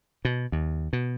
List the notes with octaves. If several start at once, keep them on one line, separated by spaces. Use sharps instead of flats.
B2
D#2
B2